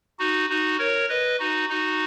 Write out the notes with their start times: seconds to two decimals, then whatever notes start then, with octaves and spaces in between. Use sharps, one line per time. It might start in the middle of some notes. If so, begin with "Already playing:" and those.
0.19 D#4 F#4
0.49 D#4 F#4
0.79 A#4 C#5
1.09 B4 D#5
1.39 D#4 F#4
1.69 D#4 F#4